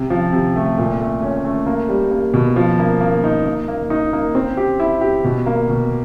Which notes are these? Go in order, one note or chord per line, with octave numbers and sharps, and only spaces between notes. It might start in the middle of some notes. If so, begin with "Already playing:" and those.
Already playing: C3
F3
C3
A3
A#2
A3
C#4
A3
A#3
G3
A#3
B2
F3
A#3
A#3
D#4
A#3
A#3
D#4
A#3
C4
G4
E4
G4
B2
A#3
B2